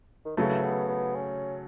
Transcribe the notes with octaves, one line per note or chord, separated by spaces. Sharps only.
D#3
C#3 E3 F#3 A3
B3
B3
C#4